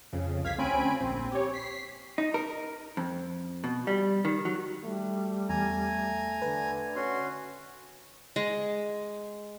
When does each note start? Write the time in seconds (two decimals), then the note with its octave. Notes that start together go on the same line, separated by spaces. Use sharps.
0.13 F2 C#3
0.43 C2 F2 F5 G#6 B6
0.58 D2 C4 C#4 G#5 B5 D7
1.01 A#1 C4
1.32 G4 C#5
1.54 B6 C7
2.18 D#4
2.34 A#4
2.97 F2
3.64 B2
3.87 G3
4.25 D#3
4.45 F#3
4.84 G3 A3
5.49 E2 G#5 A#5
6.42 D3 B4
6.96 C#4 F#4 C6
8.36 G#3